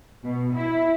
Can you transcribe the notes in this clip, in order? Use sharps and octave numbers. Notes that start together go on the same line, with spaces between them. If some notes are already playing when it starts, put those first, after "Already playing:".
B2
E4